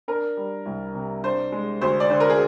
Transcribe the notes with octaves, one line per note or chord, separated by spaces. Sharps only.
D4 A#4
G3
C2
C3
D4 C5
G#3
D2 C5
D5
D3 C5
A#4
G#4